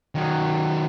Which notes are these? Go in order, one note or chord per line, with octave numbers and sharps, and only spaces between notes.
D#3 F#3